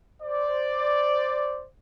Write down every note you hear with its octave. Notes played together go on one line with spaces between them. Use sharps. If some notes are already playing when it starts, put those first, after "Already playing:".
C5 D5